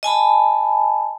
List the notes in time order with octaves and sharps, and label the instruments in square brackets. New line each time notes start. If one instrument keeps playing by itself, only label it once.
[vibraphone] D#5 G#5 A5 B5